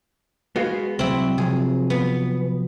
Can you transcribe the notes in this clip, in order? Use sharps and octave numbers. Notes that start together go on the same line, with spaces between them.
G#3 B3 F#4 F5
C2 F#3 C4 E4
C3 F3 F#3 G#4
B3